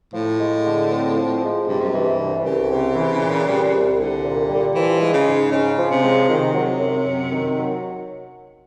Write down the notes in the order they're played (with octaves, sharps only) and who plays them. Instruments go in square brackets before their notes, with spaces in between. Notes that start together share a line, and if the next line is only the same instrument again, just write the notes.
[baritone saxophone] A2 [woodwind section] F3
[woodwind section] G#3
D3
C4
F3
G#3
[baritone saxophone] G2 [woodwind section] C3
[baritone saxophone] F#2
[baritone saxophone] G2 [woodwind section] E3
[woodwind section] C2
[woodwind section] C2 [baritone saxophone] C#3
[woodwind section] C3
E3
A#2
G3
C2
[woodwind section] C2 [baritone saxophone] D3
[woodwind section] A#2
G3
[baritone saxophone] E3 [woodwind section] F3
[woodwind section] G#3
[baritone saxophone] C#3
[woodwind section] G#2
[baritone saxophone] C#3 [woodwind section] C#4
[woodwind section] F3
[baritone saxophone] C3
[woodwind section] G#3
[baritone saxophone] C3 [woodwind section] D#3
[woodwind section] F#3
F#2
F#2
D#3
F#3